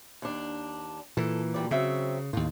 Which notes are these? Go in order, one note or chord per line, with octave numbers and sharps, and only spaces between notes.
D#2 D4
A#2 E3 A4
D2 G3 D5
C#3 F#3 C4 E5
D#2 A2 F4